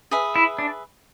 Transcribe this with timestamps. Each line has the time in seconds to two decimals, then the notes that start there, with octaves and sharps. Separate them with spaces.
0.11 G#4 B4 E5
0.36 E4
0.59 D4